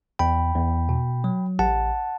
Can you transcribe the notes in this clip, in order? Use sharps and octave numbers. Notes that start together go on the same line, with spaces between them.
E2 G5 B5
E2
B2
F#3
A1 F#5 A5